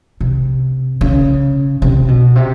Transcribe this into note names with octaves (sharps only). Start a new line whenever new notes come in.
C3
C#3
C3
B2
C3